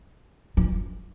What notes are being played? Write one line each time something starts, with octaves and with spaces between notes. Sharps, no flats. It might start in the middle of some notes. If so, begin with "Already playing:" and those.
F3